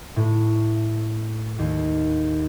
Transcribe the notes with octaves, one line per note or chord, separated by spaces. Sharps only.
A2
D#2